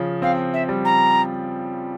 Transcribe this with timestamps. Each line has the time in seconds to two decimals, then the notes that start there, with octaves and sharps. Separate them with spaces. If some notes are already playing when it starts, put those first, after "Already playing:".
Already playing: C#3 F3
0.22 C4 F5
0.54 E5
0.69 G3
0.85 A#5